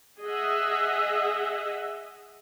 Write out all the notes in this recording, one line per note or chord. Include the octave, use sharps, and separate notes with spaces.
G#4 D#5 E5 F#5